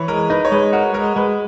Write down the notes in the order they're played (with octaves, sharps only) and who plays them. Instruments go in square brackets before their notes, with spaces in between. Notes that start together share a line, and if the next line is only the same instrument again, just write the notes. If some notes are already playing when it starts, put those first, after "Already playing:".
Already playing: [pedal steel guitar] E3 [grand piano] B4 C#5
[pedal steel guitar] G#3 [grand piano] A#4
[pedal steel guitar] D#4 [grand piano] B4
[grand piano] C#5
[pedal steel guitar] G#3 [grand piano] B4
[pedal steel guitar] F#4 [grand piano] A#4
[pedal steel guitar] G#3 [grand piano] A#4
[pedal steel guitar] G#3 [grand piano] B4